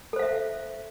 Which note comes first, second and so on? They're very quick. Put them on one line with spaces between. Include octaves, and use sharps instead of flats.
A4 C5 F5 E5